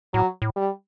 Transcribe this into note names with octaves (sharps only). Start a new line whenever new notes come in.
A2 F#3
A2
G3